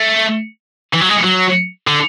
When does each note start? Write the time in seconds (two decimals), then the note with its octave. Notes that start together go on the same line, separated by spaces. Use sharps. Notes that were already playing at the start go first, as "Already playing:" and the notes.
Already playing: A3
0.93 E3
1.01 F#3
1.09 G#3
1.23 F#3
1.87 D3